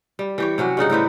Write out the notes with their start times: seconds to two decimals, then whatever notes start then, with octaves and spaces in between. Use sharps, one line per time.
0.19 G3
0.38 E3 G4 C#5
0.58 C3 F#3 C#4 F#4
0.77 G2 C#3 D#4 F#5
0.90 A2 G3 C4 B4